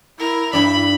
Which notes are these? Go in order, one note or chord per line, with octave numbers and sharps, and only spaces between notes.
E4 A#4
G2 D4 B5